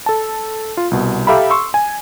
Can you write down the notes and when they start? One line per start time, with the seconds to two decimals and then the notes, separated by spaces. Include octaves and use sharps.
0.06 A4 A5
0.77 F4
0.91 C2 B2
1.27 G4 A4 E5 F5 A#5 B5
1.50 C6 C#6 E6
1.74 G#5